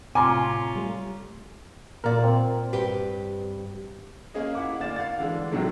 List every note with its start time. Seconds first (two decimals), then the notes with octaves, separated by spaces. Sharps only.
0.15 A2 C3 C#4 F4 G#5 A#5 C6 D6
0.75 G3 A3
2.04 A#2 A#3 A#4 D5
2.24 C4
2.73 G2 G4 B4
4.34 A#3 C#4 G#4 D#5
4.55 E4 F#5 D6
4.80 D2 A#3 D5 A6 E7
4.96 F5 F#5 A6
5.19 D3 E3 G#3 D4
5.51 A2 C3 D#3 F#3 G#3 A3